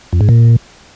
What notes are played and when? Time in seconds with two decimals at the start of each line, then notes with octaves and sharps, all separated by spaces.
0.13 F2
0.21 G#2
0.29 A#2